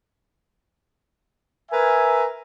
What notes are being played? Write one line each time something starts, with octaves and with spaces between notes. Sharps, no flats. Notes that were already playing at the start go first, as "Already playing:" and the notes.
A#4 B4 E5 G#5